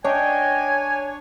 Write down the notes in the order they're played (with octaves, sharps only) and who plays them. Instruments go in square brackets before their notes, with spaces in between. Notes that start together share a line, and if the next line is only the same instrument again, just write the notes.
[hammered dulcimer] D4 [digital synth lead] C#5 [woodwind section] D#5 G5 [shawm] G#5